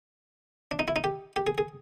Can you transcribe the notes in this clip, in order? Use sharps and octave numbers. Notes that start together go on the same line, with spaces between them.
D4
D#4
E4
D#4
G4
G4
G#4
G#4